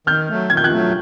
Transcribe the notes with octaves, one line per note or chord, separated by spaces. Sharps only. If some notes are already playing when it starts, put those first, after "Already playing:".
D#3 F6 G6
F#3 A3
D#3 G#6
G6
F#6 G#6
F#3 A3